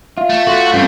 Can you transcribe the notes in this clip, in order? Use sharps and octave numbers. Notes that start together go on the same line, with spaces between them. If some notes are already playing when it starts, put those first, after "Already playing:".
F4 E5
A3
F#4 A4 C6
G2 C4 C#4